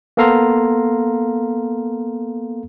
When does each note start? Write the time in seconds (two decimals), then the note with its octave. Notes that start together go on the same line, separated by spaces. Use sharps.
0.17 A#3 B3 A4 F5 A#5 C6